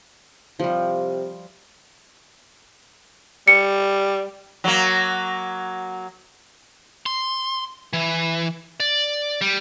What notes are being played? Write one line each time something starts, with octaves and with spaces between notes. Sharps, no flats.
C3 F3 G3
G3 C#7
F#3 A#3
C6
E3
D5
G3